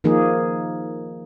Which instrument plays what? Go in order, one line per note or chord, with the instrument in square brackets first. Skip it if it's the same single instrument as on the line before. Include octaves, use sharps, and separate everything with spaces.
[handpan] D#3 F3 A#3 D#4 G#4